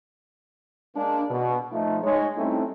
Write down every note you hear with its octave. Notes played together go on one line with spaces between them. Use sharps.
G#3 A#3 D4
B2
F3 A3 D#4
G#3 D#4 C#5
G3 A3 C4 C#4 D#4 E4